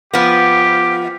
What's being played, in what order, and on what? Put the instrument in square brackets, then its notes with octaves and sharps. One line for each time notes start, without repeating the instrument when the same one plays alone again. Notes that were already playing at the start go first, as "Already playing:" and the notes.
[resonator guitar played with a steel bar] F3 B3 [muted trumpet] G4